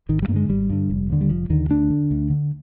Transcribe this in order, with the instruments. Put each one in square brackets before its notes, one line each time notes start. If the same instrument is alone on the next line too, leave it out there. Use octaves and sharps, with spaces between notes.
[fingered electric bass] G#1 D#3
G3
G2 A#3
D3 G#3
G#1 G3
G2 D3
F1
D#2 D3
G3
F1 F3
D#2 D3 D#3
D2 D4
D3
D2
D3